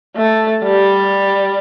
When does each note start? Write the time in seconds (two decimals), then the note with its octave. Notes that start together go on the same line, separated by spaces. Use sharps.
0.16 A3
0.63 G3